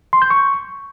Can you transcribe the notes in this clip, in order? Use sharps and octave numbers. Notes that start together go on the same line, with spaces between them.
C6
G6
C#6